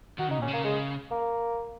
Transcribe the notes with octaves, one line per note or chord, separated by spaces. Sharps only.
D#3 F#4
C#3 D#4
A#2 C#4
C#3
A#3
G#3
A#3